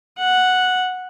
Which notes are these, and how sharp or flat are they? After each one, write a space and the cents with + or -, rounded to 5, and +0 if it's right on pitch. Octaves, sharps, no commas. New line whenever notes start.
F#5 -5